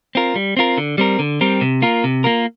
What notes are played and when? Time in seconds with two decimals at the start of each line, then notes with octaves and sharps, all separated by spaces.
0.15 C4 F4 A#4
0.35 G3
0.57 C4 F4 A#4
0.78 D3
0.98 G3 C4 A#4
1.19 D3
1.41 G3 C4 A#4
1.61 C3
1.82 A#3 F4 A#4
2.04 C3
2.24 A#3 F4 A#4